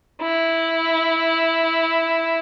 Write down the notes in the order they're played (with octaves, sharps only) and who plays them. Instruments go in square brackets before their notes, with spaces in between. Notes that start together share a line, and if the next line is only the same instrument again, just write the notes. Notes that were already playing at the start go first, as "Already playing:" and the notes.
[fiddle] E4